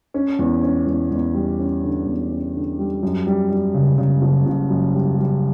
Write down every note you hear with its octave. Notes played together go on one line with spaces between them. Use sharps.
C#4
E2
C#4
E2
E2
G3
C#4
D3
E2
C#4
D3
G3
F#2
G3
G3
C#3
C#3
F#1
F#1
F#2
G3
G3